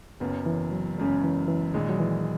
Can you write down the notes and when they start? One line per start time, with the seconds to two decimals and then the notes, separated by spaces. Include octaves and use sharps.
0.20 F#1 F#2 C#3 B3
0.46 E3
0.71 F#3
0.98 F#1 F#2 C#3 G#3
1.24 E3
1.48 E3
1.74 A#1 A#2 D#3 G#3
1.89 F#3
1.99 E3